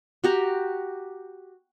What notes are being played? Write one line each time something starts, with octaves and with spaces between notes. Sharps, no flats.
F#4 G4 A#5